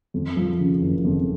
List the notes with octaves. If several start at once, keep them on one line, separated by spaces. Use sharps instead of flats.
F2
F3
C#3
F#1
F2